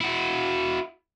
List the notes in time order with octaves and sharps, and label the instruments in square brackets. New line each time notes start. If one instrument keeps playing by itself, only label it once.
[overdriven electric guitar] E4 F#4